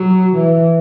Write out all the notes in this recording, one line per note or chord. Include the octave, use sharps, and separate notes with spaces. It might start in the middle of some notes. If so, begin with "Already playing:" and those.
Already playing: F#3
E3